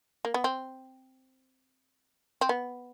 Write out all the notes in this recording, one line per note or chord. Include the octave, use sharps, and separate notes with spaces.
A#3
B3
C4
C4
B3